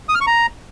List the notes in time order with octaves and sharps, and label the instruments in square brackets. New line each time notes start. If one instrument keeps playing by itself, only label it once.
[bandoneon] D#6
F6
C#6
A#5